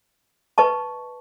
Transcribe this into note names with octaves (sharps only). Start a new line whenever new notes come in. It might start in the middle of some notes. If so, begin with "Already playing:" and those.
B4 D#5 A5 C#6